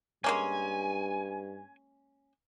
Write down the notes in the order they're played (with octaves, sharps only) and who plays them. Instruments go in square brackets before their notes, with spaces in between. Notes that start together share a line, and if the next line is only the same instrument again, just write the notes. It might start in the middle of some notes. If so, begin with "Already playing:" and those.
[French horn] G2 [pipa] G#3 A#3 C#4 [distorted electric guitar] G#5